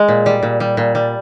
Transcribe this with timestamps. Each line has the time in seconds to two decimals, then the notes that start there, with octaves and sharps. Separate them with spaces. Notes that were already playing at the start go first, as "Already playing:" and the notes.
Already playing: G#3
0.08 A#2
0.26 G3
0.43 A#2
0.60 G3
0.77 A#2
0.95 G3